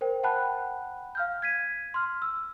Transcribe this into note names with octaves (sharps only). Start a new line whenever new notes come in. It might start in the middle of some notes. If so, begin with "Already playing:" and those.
A#4 C5 G5
F#5 G5 A5 B5 F#6
F5 F6 G6
G#6 B6 D#7
C6 F6
E6